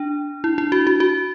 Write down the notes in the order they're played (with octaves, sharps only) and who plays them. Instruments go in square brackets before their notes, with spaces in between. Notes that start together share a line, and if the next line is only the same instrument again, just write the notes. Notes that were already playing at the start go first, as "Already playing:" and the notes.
Already playing: [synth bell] D4
E4
E4
F#4
F#4
F#4